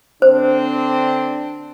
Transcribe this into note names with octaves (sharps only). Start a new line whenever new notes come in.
D3 C4 D4 C5